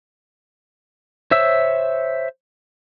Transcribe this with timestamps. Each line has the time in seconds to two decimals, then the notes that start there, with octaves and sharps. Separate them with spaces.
1.31 C5 C#5 E5 E6